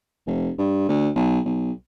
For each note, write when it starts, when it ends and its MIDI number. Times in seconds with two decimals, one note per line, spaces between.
0.27 0.50 29
0.58 0.85 43
0.89 1.09 38
1.15 1.39 35
1.45 1.71 35